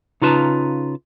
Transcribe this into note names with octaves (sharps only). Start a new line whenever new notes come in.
C#3 D#4 F4 B4 A5 A#5